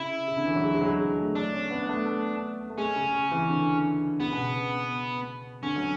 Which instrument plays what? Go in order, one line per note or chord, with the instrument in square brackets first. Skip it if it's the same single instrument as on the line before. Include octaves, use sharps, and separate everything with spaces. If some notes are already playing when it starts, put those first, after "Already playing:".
Already playing: [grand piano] C#3 [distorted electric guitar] E4
[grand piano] C#3
D3
E3
F#3
G#3
G#3
F#3
G#3
A3
[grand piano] A3 [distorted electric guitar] D4
[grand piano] C#4
B3
B3
A3
A3
A3
[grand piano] G#3 [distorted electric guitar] C#4
[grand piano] C#3
C#3
E3
D3
[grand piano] C#3 [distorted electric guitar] B3
[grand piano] B2
C#3
[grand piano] D3 [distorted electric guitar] C#4
[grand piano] F#3